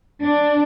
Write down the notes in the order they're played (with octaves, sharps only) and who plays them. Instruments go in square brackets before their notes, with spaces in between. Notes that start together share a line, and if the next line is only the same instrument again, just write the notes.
[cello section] D4